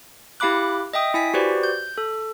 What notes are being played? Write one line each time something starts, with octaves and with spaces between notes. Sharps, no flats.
E4 G4 F5 B5 D6 F#6
D#5 E5 G5 D#6
E4 G#5 B6
F#4 G4 B4 C5 D5
G6
A4